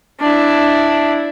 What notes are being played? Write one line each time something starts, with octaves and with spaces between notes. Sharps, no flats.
D4 E4